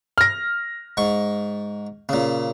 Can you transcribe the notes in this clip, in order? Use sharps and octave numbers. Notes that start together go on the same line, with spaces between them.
F6 A#6
G#2 C#6
A#2 C#3